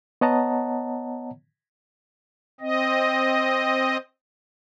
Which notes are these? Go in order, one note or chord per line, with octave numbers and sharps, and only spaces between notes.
B3 C#5 D#5 F#5 A5 A#5
C4 D#5